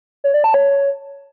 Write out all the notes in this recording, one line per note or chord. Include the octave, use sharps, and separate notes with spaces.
C#5
D5
A5
C#5